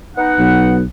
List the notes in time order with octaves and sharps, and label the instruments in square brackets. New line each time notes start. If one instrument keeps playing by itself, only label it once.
[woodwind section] B3 D#4 F#5
[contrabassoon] B1